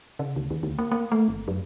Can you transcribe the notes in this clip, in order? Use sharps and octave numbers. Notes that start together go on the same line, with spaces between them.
C#3
D2
D#2
D2
A#3
A#3
A3
G1
F#2